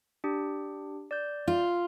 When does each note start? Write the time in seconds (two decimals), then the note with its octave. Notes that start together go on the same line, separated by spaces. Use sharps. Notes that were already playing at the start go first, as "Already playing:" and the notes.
0.24 D4 G4
1.11 D5 G6
1.48 F4